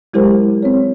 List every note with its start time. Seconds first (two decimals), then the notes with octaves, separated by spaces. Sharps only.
0.14 F#3 G#3 E4 G4 A#4 C5
0.63 C4 C#5